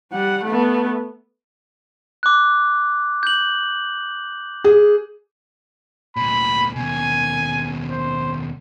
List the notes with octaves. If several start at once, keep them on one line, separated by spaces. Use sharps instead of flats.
G3 F#5
A3 B3
D6 F#6
G6 F#7
G#4
D2 A#2 B5
D#2 B2 G#5
C5